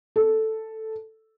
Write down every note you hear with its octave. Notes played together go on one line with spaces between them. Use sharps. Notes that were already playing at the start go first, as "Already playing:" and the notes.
A4